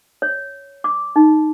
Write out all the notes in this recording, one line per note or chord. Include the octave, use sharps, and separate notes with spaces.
C#5
D6
D#4